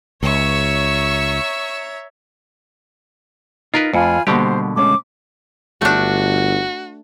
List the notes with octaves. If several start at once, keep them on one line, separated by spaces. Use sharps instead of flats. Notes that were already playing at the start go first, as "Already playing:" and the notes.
C#2 C#5 E5 A#5 C#6 E6
D#4 F4 A#4 B4 A#5
F2 A3 F4 G#5 B5
B2 D3 G3 A#3 G4 C5
G#3 A3 C#4 D6
G1 A3 D4 F#4